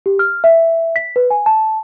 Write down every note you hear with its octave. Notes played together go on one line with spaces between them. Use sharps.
G4
F6
E5
B6
B4
G#5
A5